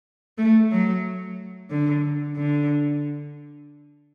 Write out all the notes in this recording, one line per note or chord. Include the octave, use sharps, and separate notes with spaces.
A3
F#3
D3
D3